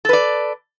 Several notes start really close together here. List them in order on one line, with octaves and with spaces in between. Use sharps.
A4 B4 D5